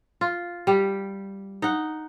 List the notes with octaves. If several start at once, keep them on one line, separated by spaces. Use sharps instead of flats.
F4
G3 G4
D#4 F#5